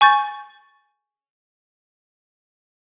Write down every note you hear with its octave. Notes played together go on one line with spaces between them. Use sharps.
G#5 C#6 G6 A6